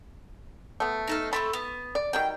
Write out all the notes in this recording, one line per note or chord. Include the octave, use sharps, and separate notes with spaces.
A3 B3
D#4 A4 F5
A3 C4 A4 B5
B3
D5
D#3 F#3 G3 G5